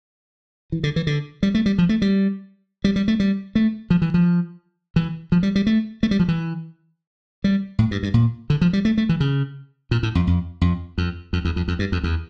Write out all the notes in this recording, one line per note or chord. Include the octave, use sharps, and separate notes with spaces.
E3
D3
E3
D3
G3
A3
G3
F3
A3
G3
G3
G3
A3
G3
A3
F3
E3
F3
E3
F3
G3
G3
A3
A3
G3
F3
E3
G3
A2
G2
G2
A#2
D3
F3
G3
A3
A3
E3
C#3
A#2
A2
F2
F2
F2
F2
F2
E2
F2
F2
G2
F2
E2